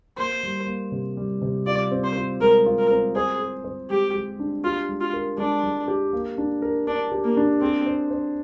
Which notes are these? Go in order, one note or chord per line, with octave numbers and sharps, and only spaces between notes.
A#3 C5
G3
A#3
C3
G3
C3
F4 D5
C4
C5
F4
G#3 A#4
F4
A#4
C4
G#4 C5
G#4
C5
G#3 G4
G#3
D4
F4 G4
G#3
F4
A#4
G#3 D4
G#3
G4
A#3
D4
A#4
D4 A#4
G4
A#3
D4
C4 G#4
C5
C5